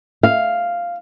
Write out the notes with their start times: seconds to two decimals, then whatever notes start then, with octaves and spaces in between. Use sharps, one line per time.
0.23 F5